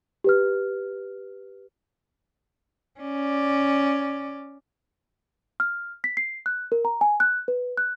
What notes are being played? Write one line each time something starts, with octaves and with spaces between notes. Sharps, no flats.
G4 B4 F6
C#4 D5
F6
B6
C7
F#6
A#4
A#5
G#5
F#6
B4
F#6